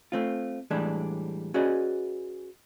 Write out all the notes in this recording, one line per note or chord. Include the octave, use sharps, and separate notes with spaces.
A3 C4 F4
A2 E3 G3 G#3 D4
C#4 F#4 G#4 B4 D5 D#5